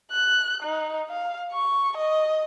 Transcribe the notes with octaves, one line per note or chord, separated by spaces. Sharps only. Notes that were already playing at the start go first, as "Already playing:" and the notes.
F#6
D#4
F5
C#6
D#5